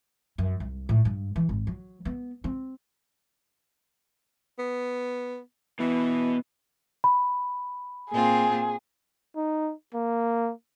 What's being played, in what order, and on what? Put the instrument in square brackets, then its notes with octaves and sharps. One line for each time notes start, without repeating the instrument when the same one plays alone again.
[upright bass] F#2
C2
A2
G2
E3
G#1
F#3
B3
C4
[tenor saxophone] B3
[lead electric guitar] B2 B3 [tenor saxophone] E3
[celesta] B5
[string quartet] A#2 C4 F4 [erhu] G#4
[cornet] D#4
A#3